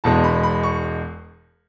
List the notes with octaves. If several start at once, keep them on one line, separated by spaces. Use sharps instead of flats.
E1 E2 B2 G#3 A5
B5
B5
C#6